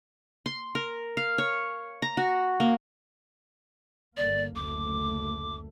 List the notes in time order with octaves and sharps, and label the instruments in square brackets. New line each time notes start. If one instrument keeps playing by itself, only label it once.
[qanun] C6
A#4
F5
C#5
A#5
F#4
A#3
[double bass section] G1 D3 A#3 [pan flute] D5
[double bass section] F#1 D2 A3 [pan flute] D6